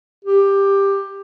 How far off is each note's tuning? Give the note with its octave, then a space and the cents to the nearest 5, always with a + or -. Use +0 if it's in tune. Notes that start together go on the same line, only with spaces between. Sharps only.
G4 +10